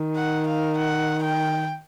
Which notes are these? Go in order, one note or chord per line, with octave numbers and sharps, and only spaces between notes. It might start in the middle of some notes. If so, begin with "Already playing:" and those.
Already playing: D#3
F#5
F5
F#5
G5